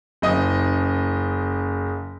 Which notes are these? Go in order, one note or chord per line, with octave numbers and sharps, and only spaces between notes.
F#1 D#5